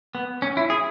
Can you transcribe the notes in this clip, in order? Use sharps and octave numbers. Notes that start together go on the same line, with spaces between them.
B3
C#4
E4
G#4